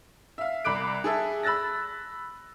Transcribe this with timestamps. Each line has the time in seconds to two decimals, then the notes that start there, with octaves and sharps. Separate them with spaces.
0.38 E5 F5
0.64 C2 B5 D6 F#6 D7
1.04 G#4 A4 E5
1.43 B5 E6 F#6 A6 A#6